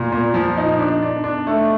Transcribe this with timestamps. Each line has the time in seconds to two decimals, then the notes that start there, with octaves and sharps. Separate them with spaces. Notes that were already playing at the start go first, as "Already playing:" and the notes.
Already playing: A#2
0.12 A#2
0.34 F3
0.57 D#4
0.79 D4
1.03 D4
1.24 D4
1.47 A3